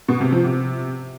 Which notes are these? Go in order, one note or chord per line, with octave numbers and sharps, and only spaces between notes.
B2
C3
F3
C3